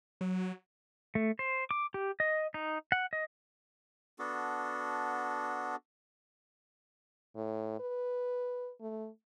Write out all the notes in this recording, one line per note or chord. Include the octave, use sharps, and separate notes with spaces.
F#3
A3
C5
D6
G4
D#5
D#4
F#5
D#5
B3 D4 F#4 A4
A2
B4
A3